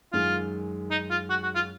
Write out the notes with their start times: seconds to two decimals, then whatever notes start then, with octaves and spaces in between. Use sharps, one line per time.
0.13 F#2 D#3 G#3 F4
0.91 D#4
1.10 F4
1.30 F#4
1.43 F#4
1.55 F4